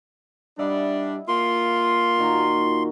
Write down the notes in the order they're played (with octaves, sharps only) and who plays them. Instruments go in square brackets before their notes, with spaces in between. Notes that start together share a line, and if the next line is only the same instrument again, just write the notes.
[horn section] G3 D4 [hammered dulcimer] E4 D#5 F#5
[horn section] A#3 F4 [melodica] C6
[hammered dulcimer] A#2 D#3 F#4